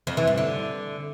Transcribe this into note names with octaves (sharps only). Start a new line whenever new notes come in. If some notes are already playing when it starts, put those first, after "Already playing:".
F2
E3
G2
D3